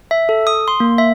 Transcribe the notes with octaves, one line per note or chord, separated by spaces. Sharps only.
E5
A4
D#6
C6
A#3
E5